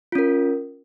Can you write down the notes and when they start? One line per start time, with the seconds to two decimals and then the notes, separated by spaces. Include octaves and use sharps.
0.12 F4
0.15 C#4
0.18 A#4